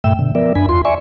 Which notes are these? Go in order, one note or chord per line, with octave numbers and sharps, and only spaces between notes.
G2 A#2 A3 E5 G5 E6
B2 D3
F3 B3 A#4 D5 E5
F#2 D4 G#5 B5
E2 F4 C6
D5 E5 G#5 C#6